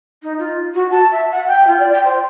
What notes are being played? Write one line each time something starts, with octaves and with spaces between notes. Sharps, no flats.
D#4
F4
F#4
A5
E5
F#5
G5
F4
D5
G5
C5